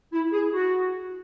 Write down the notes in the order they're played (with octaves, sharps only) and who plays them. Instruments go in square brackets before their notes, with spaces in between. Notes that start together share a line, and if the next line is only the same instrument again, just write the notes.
[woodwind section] E4
G#4
F#4